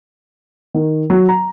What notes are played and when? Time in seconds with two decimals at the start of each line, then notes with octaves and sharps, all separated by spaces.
0.74 D#3
1.10 F#3
1.29 A#5